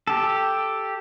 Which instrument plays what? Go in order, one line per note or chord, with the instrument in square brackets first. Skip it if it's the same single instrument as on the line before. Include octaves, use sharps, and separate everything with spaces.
[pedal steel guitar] G4 A4